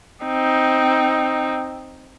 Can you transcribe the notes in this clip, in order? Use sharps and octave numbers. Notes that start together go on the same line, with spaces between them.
C4 D#4